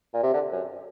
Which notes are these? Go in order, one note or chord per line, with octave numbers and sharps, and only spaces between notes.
A#2
C3
D3
F#2